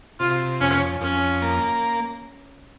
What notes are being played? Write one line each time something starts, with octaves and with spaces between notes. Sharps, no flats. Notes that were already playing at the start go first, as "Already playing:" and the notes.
C3 F4
F2 C#4
F2 C#4
A#3